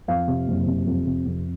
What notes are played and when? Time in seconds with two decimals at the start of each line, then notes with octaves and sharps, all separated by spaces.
0.08 F2 F5
0.28 C3
0.47 F#1
0.66 C3
0.86 F2
1.06 C3
1.26 F2